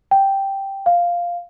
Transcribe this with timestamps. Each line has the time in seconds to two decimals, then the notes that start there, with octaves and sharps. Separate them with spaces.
0.11 G5
0.86 F5